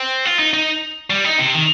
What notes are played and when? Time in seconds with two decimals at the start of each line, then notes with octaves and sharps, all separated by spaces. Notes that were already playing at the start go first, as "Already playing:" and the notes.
Already playing: C4
0.25 F4
0.39 D#4
0.54 D#4
1.10 G3
1.24 D#4
1.39 C3
1.54 D#3